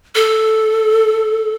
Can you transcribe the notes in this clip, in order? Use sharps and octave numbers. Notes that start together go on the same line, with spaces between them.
A4